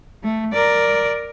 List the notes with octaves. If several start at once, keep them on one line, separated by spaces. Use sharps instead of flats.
A3
A#4 D5